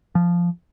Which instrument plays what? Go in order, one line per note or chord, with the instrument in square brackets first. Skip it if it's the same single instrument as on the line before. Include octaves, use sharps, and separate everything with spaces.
[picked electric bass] F3